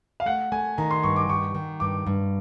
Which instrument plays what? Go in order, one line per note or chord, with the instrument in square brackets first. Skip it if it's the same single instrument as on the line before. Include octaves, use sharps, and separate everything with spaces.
[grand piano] F5
[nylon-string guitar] A3 [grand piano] F#5
[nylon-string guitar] A3 [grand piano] G#5
[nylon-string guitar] D#3 [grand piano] A#5
[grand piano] C6
[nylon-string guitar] G2 [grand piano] C#6
[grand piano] D6
[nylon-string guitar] D#3 [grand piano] C#6
[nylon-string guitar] D#3
[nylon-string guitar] G2 [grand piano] D6
[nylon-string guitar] G2